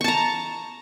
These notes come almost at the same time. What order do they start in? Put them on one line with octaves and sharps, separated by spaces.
C#6 A5 A#5